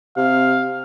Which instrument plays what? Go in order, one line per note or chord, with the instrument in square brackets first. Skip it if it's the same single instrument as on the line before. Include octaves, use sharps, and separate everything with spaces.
[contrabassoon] C3 [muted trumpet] F5